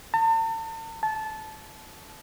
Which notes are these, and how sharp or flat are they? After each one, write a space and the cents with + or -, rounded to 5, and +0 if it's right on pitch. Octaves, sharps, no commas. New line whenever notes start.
A5 +40
A5 -20